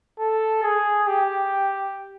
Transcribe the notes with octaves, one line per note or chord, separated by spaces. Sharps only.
A4
G#4
G4